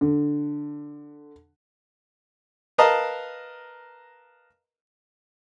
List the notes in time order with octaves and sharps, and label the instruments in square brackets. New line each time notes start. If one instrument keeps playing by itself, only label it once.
[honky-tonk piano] D3
[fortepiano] A#4 B4 D#5 F5 A5 A#5